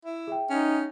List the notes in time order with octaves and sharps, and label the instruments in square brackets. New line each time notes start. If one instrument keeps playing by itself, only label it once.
[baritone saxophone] E4
[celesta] G#4 E5 G5
[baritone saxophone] C#4 [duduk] D#4